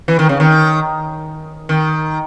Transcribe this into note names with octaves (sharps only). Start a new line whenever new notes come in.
E3
D#3
C#3
D#3
D#3